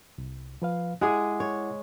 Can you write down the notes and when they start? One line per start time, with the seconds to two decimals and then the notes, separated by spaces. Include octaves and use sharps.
0.18 C2
0.62 F3 B4 F5
1.01 G#3 E4 G#4 F#5 D6
1.40 C#5